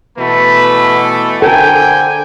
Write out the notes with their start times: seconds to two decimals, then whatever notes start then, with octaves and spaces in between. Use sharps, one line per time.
0.18 B2 E3 A3 B4
1.42 D3 A4 A#4 C5 G5 G#5